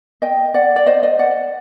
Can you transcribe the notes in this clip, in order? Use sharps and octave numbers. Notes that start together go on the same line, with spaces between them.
D#5 G5
D5 F#5
D5
C5 D#5
C5 D#5
D5 F#5